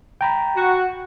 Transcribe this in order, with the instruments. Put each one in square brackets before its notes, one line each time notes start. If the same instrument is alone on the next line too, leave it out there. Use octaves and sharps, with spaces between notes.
[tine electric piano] G5 A#5 B5
[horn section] F#4